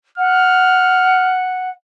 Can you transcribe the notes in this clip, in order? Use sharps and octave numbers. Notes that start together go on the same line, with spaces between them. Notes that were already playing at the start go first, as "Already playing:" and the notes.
F#5 F6